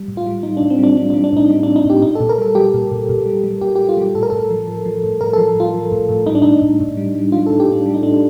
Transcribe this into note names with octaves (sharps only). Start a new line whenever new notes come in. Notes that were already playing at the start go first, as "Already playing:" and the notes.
Already playing: G3
A2
F4
G3
G3 D#4
D4
A2
C4
G3 D4
G3 D4
D4
G3
D4
A2 D#4
G3
D4
A2
D#4
A2 G4
A#2 D#4
A4
A#2
A#4
G3 A4
G3 G4
A#2
A#2
A#2
G3
G3
A#2 G4
G4
G3
F4
G3 G4
A2 A4
A#4
A2 A4
F3
F3
F3
A2
A2 A#4
A4
F3
A2 F4
F3
A2
A2
G3 D#4
D4
A2 D#4
A2
A2
G3
G3
G3 F4
A4
A2
G4
A2 D4
G3
D#4
A2 D4